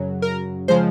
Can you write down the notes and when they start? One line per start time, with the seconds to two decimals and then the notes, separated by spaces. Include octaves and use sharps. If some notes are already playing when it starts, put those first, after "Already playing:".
Already playing: F#2 C#3 F#3
0.22 A#4
0.68 C#3 F3 G#3 C5